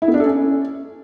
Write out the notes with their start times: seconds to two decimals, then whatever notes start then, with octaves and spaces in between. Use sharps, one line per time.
0.02 E4
0.08 B3
0.14 D4
0.20 A4
0.26 C#4